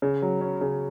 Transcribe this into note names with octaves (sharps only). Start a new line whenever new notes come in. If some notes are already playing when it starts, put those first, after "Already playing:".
C#3
F#3
C#4
C#3